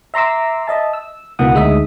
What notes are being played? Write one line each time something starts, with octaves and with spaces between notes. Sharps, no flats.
E5 A#5 C6 D6 E6
D#5 E5 A5
E6
C#2 B2 E3 A#3 F#5 D#6
D2 G#3 D#4 E5 D#6